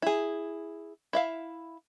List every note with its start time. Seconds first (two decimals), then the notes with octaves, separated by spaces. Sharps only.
0.02 E4 G#4
1.13 E4 E5 F5